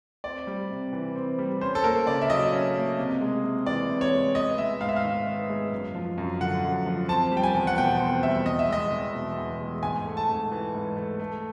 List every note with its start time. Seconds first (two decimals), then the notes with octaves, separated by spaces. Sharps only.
0.24 C4 D5
0.47 G3
0.70 C3
0.93 E3
1.16 C4
1.39 G3
1.61 C#4 C5
1.75 A4
1.84 A#3 A#4
2.07 C#3 D5
2.21 E5
2.30 F#3 D#5
2.52 C#4
2.76 A#3
2.98 C3
3.21 G#3
3.44 C3
3.66 E3 D5
3.90 C3
4.01 C#5
4.12 G#3
4.35 B3 D#5
4.58 G#3 E5
4.81 G#2 F5
4.89 E5
4.96 F5
5.03 D#3
5.27 B3
5.49 G#3
5.72 F#2
5.95 F3
6.18 F#2
6.41 D3 F#5
6.64 F#2
6.86 F3
7.09 C4 A5
7.32 G3
7.37 G5
7.43 G#5
7.54 E2
7.67 F#5
7.78 B2 G5
8.00 C4
8.23 G3 E5
8.46 E2 D#5
8.59 E5
8.69 G#3 D#5
8.92 E2
9.15 B2
9.38 E2
9.60 G#3
9.83 G#2 G#5
10.05 A3
10.17 A5
10.29 G#2
10.51 E3
10.74 G#2
10.97 A3
11.19 A3